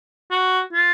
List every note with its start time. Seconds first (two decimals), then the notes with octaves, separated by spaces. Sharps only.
0.31 F#4
0.73 F4